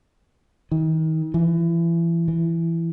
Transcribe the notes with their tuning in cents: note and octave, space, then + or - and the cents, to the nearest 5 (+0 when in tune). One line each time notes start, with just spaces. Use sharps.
D#3 +35
E3 +30
E3 +15